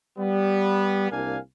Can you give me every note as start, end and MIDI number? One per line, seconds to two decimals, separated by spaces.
0.19 1.08 55
0.19 1.08 59
1.11 1.37 36
1.11 1.37 58
1.11 1.37 62
1.11 1.37 77
1.11 1.37 80